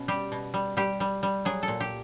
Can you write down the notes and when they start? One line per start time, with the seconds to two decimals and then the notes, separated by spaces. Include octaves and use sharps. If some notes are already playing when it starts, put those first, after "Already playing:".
Already playing: B2 C#4
0.08 G3 G4
0.32 B2
0.54 G3
0.77 G3 G4
1.00 G3
1.23 G3
1.45 F#3 G#4
1.63 A4
1.68 A#2
1.80 G4